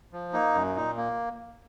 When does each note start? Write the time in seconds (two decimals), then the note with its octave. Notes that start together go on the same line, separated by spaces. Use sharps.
0.13 F3
0.33 A#3 D#4
0.54 F#2
0.76 A#2 D#4
0.97 A#3